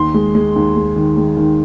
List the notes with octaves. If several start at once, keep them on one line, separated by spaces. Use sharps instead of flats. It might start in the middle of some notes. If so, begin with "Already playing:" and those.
Already playing: D#2 C6
G#3
G#3
D#2
G#3
D#3
G#3
D#3